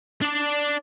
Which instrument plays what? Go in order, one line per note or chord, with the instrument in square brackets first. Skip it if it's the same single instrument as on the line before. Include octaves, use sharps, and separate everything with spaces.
[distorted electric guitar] D4 D5